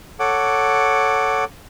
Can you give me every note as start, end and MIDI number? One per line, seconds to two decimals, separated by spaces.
0.20 1.44 69
0.20 1.44 73
0.20 1.44 78
0.20 1.44 86